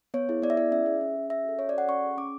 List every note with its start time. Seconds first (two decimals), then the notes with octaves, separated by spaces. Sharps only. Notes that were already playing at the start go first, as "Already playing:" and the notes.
0.14 B3 C#5
0.29 E4 G#4
0.42 B3 D5
0.50 E5
0.57 E4 G#4 D5
0.72 C#4 E5
0.86 G#4
1.01 C#4
1.16 G#4
1.30 C#4 E5
1.45 F#4 A4
1.59 C#4 C#5
1.69 D5
1.73 F#4 A4 F#5
1.88 C#4 C#6
2.03 G#4
2.17 C#4 D6